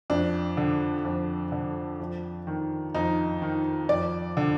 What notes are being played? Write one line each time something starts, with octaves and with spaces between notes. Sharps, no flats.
F2 D4
D3
F2
D3
F2
D#3
F2 D#4
D#3
F2 D5
D3